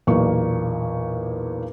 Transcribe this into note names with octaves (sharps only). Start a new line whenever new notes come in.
B1 E2 A#2 A#3 A#4 C#6